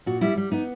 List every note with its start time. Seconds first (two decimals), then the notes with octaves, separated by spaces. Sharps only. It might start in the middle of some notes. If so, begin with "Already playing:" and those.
0.06 A#2 F#4
0.21 G3 E4
0.37 G3
0.52 B3 D#4